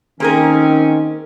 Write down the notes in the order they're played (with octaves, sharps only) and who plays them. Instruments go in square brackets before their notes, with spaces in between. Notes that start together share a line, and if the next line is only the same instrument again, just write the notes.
[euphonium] D#3 [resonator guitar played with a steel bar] A#3 G#4 A#4 [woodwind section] C4 C#4